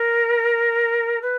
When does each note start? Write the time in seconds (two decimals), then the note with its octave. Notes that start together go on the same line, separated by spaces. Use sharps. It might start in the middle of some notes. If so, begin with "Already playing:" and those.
Already playing: A#4
1.21 B4